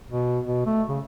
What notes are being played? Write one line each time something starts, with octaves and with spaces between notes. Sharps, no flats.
B2
B2
A3
C#3